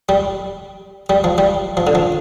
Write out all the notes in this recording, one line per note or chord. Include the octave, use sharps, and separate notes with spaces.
G3
G3
F3
G3
F3
D3
F3